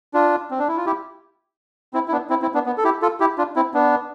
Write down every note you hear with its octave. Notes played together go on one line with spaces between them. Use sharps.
D4 F4
C4
D4
E4
F4
E4 G4
C4 E4
E4
B3 D4
C4 E4
C4 E4
B3 D4
B3
A4
E4 G4
F4 A4
E4 G4
D4 F4
C4 E4
B3 D4